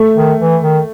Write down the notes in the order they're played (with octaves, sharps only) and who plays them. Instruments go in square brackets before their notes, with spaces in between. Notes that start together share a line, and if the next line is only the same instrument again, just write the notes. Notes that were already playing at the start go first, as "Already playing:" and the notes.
Already playing: [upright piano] A3
[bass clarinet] D#3
E3
D#3